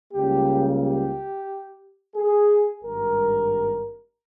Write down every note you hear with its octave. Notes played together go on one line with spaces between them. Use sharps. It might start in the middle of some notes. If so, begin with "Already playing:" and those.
C#2 C#3 G3 A#3 G4
G4
G#4
G#1 G2 G3 A#4